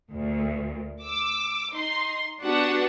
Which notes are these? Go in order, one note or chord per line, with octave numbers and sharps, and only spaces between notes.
D2 A#2
D6 E6
D#4 C6
B3 D4 F#4 G4 B4 F#5